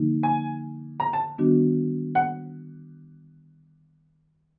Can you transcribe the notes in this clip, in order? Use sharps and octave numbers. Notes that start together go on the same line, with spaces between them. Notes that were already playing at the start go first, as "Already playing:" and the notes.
Already playing: D3 F3 A#3 D#4
G#5
A#5
A5
D#3 G3 B3 D4 F#4
F#5